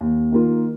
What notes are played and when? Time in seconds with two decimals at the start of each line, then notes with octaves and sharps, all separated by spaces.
0.01 D#2
0.32 D#3 A#3 F4